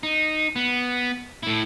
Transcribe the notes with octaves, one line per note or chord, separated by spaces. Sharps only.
D#4
B3
A2 E4